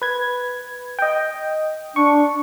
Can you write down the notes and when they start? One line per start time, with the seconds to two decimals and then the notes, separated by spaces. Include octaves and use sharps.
0.02 B4 G#6
0.99 D#5 G5
1.96 D4 C#6